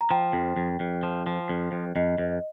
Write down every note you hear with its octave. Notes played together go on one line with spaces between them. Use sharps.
A#5
F3 G5
F2
F2
F2
F3
F3
F2
F2
F2 D#5
F2